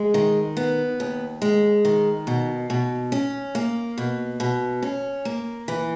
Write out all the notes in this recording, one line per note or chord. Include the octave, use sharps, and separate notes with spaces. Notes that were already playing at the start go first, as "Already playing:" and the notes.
Already playing: G#3
D#3
B3
D#2
G#3
D#3
B2
B2
C#4
A#3
B2
B2
C#4
A#3
E3